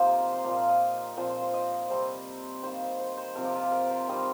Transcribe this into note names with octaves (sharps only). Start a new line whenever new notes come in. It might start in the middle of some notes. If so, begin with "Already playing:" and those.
Already playing: C3 F3 A#3 C4 D#4 F4 G4 C5
D#5
A#5
C6
A#2 F3 A#3 A#5
F5
D#5
A#2 F3 C4 C5
C5
C5
D#5
D#5
C3 G3 C4 C5
D#3 A#3 C5
C5
C5
C3 F3 C4 A#4
G4
F4
G4
A#4
C5
D#3 G3 C4 D#5